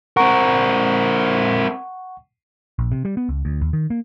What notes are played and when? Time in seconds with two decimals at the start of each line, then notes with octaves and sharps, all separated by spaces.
0.17 C4 A#4 F#5 C#6
2.79 A#1
2.92 C3
3.05 G3
3.17 B3
3.29 C#2
3.45 D2
3.61 D#2
3.73 D#3
3.90 A#3